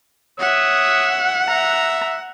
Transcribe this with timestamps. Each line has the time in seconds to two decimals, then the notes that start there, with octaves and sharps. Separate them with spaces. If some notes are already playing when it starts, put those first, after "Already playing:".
0.39 C#5 E5 F#5 D#6
1.48 E5 A#5